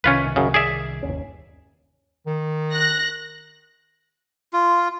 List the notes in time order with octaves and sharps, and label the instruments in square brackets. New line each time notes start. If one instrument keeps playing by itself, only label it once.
[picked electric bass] C2 C3 D#3 [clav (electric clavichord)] C#4 F4 B4
[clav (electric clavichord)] F#2 C#3
G#4 D5 E5
[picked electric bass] G1 D#2 C#4
[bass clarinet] D#3
[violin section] F#6 A#6
[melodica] F4